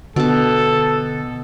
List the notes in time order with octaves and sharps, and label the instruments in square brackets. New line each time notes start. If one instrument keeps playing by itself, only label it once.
[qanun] B2 A5 [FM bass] D3 [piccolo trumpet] A4